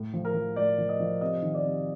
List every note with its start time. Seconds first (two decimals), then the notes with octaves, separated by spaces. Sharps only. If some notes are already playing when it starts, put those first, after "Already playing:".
Already playing: A2
0.14 F3
0.25 A#4
0.34 F3
0.56 A2 D5
0.78 F3
0.89 D#5
1.00 F3
1.21 C3 D#5
1.42 D#3
1.54 D5
1.64 C3